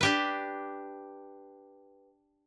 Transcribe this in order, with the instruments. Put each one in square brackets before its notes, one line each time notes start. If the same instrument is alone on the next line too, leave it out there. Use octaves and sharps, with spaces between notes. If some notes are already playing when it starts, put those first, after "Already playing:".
[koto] D4 G4 B4